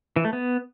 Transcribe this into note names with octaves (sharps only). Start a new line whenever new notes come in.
E3
A3
B3